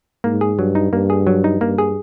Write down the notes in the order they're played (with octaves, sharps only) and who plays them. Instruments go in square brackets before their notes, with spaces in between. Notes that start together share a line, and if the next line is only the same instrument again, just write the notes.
[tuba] G#2 [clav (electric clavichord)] A#3
[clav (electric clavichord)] G#4
[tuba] G2 [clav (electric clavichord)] F#3
[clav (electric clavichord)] D#4
[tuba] G2 [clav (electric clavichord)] A#3
[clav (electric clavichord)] G#4
F#3
D#4
[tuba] G2 [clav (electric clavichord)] A#3
[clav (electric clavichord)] G#4